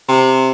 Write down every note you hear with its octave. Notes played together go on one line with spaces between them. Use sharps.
C3